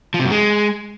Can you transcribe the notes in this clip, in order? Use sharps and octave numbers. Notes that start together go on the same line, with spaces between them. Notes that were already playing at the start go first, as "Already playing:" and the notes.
F3
C3
F#2
G#3